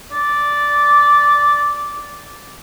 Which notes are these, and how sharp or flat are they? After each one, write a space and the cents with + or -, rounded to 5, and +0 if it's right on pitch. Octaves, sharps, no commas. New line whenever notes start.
D5 -10